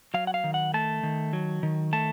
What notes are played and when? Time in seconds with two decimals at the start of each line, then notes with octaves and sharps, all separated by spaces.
0.14 F#3 F5
0.27 F#5
0.34 F5
0.44 D#3
0.54 F#5
0.74 A3 A5
1.03 D#3
1.33 F#3
1.63 D#3
1.93 A3 A5